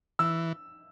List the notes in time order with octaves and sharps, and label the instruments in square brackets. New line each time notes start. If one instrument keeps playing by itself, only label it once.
[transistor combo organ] E3 [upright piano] E6